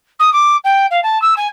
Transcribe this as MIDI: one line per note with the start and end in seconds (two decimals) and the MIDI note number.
0.19 0.32 87
0.32 0.56 86
0.64 0.86 79
0.90 1.00 77
1.03 1.20 81
1.21 1.34 88
1.36 1.47 80